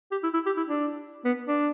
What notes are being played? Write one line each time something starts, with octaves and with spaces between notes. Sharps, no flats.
G4
E4
E4
G4
E4
D4
B3
D4